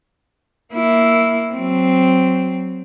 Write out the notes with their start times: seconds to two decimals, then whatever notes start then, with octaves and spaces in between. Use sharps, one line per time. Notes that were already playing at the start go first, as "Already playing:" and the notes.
0.74 A#3 E4
1.53 F#3 C4